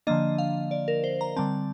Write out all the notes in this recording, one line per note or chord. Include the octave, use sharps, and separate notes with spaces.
D3 F3 A#3 D4 D#5
F5
D5
A#4
C5
A#5
D3 G3 C4 A5